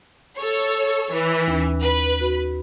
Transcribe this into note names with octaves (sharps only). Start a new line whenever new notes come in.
A4 C#5
E3
D#2 C#4
B4
F#4